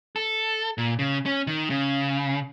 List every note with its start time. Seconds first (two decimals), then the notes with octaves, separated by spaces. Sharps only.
0.16 A4
0.78 A#2
0.99 C#3
1.26 C#4
1.47 D#3
1.70 C#3